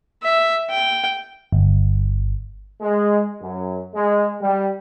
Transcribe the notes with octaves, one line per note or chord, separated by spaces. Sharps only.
E5
G5
G1
G#3
F#2
G#3
G3